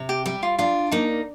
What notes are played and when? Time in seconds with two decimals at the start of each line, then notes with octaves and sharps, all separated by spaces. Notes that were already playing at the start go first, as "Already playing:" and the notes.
Already playing: C3
0.09 G4
0.26 G3 G4
0.43 F4
0.59 D4 F4
0.92 A#3 D#4